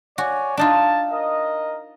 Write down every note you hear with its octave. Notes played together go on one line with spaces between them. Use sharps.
F#4 C#5 D5 G#5
D4 D#4 F4 A5
A#4 D#5